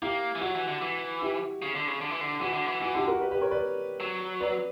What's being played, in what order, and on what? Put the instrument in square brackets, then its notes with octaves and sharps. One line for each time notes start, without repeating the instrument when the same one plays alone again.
[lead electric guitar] A#3 [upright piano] E4 G4
[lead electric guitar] E3
[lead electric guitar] F#3 [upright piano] F#4
[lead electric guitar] E3
D3
E3
[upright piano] E4 G4
[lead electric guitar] C#3
D3
C#3
D3
E3
D3
[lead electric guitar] E3 [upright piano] F#4
[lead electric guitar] D3
E3
[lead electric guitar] E3 [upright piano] F#4
[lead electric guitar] D3 [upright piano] E4 G4
[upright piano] F#4 A#4
G4 B4
G4 B4
A#4 C#5
B4 D5
[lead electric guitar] F#3
[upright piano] B4 D5